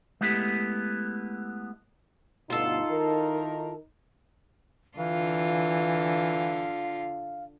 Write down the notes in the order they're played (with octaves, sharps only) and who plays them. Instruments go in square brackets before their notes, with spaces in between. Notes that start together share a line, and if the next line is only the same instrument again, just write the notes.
[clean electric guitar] G#3 A3 B3 E4 G4
[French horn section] D2 G2 B2 [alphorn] D#4 [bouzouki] F4 A4
[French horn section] D#3 E4 A#4
[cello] D3 F4 [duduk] E3 [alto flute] F5